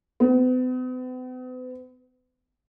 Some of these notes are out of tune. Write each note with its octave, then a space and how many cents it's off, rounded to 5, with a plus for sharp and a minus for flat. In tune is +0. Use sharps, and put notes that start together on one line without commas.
B3 +45